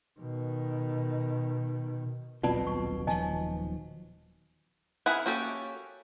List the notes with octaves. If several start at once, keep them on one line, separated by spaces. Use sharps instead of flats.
B2 D#3
D#1 B1 B2 C4 F4 D5 A5
C#6
D#3 F3 F#3 D#5 G#5 A5
C4 E4 G#4 A#4 F#5
A#3 C#4 F#4 G4 A4